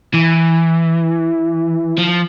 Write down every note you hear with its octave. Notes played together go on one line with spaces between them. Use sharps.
E3
F3